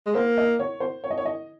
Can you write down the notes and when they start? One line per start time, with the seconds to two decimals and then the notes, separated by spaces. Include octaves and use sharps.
0.06 G#3
0.15 A#3 C5
0.38 D#5
0.59 C#5
0.80 C5
1.04 C#5
1.10 D#5
1.18 C#5
1.25 D#5